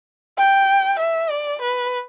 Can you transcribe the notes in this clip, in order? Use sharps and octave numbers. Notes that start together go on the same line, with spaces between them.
G5
E5
D5
B4